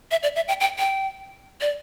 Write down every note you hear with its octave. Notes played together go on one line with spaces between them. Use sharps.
E5
D5
E5
G5
G5
G5
D5